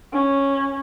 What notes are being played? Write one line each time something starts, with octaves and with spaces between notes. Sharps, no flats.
C#4